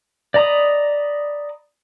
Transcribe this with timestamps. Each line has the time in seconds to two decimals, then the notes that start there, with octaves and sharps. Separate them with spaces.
0.34 D5 D#5 A#5 B5 D#6